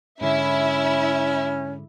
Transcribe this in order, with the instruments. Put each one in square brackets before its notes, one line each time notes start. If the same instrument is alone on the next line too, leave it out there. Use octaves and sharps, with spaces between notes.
[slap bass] G#2 D3 [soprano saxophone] C#4 [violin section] E4 E5